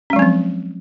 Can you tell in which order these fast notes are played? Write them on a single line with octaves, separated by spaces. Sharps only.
C#4 G#3 F#3 C4 F3